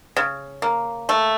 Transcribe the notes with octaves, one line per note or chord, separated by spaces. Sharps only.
C#3
A#3
A3